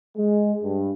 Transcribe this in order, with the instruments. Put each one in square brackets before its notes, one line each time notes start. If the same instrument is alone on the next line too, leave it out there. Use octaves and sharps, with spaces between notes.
[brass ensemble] G#3
G2